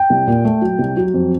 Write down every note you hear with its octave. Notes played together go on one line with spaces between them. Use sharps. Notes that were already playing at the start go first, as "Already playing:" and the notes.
Already playing: G5
C2
A#2
A3
F#3
C2
F#3
F2